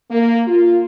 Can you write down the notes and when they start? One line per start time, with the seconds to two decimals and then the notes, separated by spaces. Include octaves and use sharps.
0.11 A#3
0.48 F4